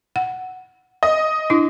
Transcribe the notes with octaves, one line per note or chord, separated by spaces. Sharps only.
F#5
D#5
D4 E4